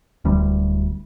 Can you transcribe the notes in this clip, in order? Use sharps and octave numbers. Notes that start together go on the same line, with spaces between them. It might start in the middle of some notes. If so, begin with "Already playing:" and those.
D1 D2 G3